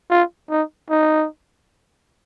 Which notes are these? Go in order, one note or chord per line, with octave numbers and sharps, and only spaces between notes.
F4
D#4
D#4